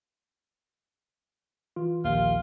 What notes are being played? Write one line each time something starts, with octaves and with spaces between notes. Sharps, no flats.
E3 F4
A#1 D#2 F4